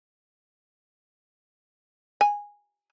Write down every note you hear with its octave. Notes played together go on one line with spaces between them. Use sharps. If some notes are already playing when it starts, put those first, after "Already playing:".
G#5